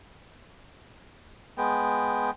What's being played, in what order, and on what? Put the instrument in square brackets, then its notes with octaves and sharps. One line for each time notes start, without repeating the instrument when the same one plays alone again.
[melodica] G#3 B3 G5